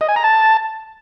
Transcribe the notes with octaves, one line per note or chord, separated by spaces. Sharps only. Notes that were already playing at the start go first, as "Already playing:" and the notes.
D#5
G#5
A#5
A5